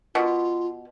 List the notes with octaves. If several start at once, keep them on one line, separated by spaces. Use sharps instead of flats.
B2 F4